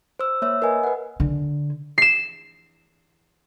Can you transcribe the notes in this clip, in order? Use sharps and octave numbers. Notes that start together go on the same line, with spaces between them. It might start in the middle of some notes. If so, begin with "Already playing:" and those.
C5 E6
A#3 C#5 E5 E6
A#4 B4 D#5 G#5
B4 F#5
D3
C7 E7